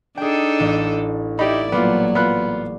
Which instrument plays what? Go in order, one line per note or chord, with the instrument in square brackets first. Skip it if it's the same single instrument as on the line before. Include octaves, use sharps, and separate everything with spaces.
[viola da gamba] D4 D#4 A4 [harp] G#4 G5
[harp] A1
[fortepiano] D#4 G4 [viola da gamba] E4 D5 [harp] B5
[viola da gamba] A#2 F#3 [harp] G3 [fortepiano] B3 F4
[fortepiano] B3 F4 F#6